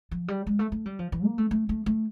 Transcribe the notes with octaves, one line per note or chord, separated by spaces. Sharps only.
F3
G3
G#3
A3
A3
G3
F3
E3
A#3
A3
A3
A3
A3